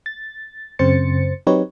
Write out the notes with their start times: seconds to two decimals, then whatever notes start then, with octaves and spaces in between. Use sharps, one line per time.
0.06 A6
0.79 F#2 C#3 C4 C5 A6 C#7
1.47 F#3 C4 D#4 G4 B4 C#5